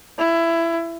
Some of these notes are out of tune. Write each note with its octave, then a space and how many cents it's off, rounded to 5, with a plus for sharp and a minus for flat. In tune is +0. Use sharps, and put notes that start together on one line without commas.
E4 +20